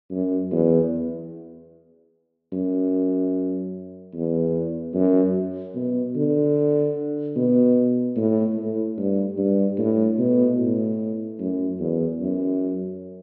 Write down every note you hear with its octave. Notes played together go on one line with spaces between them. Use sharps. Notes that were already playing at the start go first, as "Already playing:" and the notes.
F#2
E2
F#2
E2
F#2
B2
D3
B2
A2
A2
G2
G2
A2
B2
A2
F#2
E2
F#2